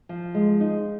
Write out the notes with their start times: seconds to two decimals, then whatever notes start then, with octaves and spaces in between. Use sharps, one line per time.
0.09 F3
0.35 G#3
0.60 D#4